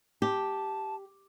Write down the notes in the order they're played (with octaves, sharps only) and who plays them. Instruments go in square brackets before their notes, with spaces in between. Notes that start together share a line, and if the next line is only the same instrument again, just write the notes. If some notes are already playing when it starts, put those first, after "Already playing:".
[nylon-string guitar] G4 [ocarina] A5